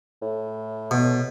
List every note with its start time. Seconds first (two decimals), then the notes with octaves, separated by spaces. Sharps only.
0.22 A2
0.91 B2